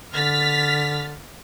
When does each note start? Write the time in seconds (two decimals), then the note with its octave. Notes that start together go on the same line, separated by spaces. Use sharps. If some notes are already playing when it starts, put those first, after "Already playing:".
0.13 D3 F6 A6 B6